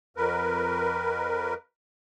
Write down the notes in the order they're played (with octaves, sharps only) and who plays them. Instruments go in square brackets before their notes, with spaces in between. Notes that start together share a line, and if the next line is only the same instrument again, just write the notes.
[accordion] F2 A#4 B4